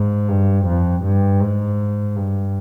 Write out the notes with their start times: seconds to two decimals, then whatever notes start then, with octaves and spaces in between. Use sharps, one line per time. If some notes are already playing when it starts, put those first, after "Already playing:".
Already playing: G#2
0.28 G2
0.66 F2
1.04 G2
1.40 G#2
2.16 G2